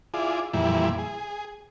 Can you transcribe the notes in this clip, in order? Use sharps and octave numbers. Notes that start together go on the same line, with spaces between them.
E4 F4 G#4 D5
F2 A#2 E3 G3 E4
G#4